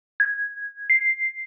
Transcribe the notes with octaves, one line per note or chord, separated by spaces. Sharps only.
G#6
C7